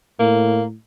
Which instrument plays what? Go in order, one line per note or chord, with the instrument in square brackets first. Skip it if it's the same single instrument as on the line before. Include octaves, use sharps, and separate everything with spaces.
[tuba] A2 [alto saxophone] A#3